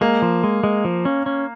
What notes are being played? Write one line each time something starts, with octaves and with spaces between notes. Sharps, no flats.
G#3 A#3
F3
G#3
G#3
F3
C#4
C#4